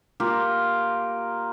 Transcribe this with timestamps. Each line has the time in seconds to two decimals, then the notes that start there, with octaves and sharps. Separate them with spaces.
0.20 A#3 F4 G4